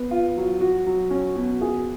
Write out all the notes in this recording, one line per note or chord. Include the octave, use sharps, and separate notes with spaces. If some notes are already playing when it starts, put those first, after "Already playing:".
Already playing: B3
F4
F#3
F#4
F#3
C#4
B2
G#4